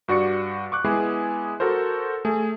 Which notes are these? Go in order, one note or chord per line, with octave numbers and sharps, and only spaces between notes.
G2 F#4 D5 C#6 C#7
C#6 D6 F#6
G#3 B3 E4 G#4 C7
F#4 A4 A#4 C5
A3 G#4